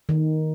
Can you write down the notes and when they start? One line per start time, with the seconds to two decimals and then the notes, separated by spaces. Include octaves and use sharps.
0.09 D#3